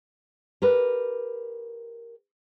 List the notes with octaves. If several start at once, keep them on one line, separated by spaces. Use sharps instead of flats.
G4 A#4 B4